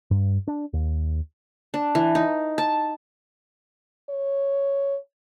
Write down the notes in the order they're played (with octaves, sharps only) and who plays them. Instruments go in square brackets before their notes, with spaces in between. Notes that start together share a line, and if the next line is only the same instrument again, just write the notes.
[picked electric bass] G2
D4
D#2
[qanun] D4
E3
D#4
A5
[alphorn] C#5